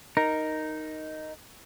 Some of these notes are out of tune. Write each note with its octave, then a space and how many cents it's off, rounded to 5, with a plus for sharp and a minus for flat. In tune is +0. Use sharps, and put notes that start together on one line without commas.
D#4 +0 A#4 +0